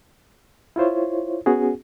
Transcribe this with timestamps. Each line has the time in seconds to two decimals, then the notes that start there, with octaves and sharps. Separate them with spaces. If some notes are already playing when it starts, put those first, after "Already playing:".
0.76 E4 F4 C5 C#5
1.46 B3 C#4 F#4 G#4